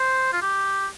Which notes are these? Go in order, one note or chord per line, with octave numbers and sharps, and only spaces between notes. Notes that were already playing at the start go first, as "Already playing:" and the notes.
Already playing: C5
F4
G4